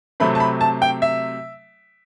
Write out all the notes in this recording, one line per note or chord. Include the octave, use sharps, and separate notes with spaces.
C3 F#3 A3 C4 B5
A5
B5
A5
G5
E5